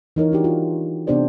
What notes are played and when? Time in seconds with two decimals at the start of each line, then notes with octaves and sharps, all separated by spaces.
0.16 E3 D#4 A#4 C#5
0.32 D4 F#4 G4
0.44 F4
1.07 C3 B3 D4 G4 C5 D5